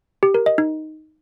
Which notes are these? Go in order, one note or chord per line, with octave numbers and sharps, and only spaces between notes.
G4
A#4
D#5
D#4